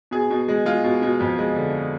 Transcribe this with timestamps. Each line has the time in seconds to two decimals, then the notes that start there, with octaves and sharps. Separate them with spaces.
0.11 B2 G#4
0.30 B2
0.48 G#3
0.66 G#3 F4
0.84 B2
1.02 B2
1.20 F2
1.38 G#3
1.56 D3